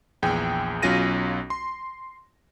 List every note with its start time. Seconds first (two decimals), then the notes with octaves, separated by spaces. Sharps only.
0.22 A#1 E2 G#4 G5
0.83 B1 F#3 C#4 F4 A#6 D#7
1.50 C6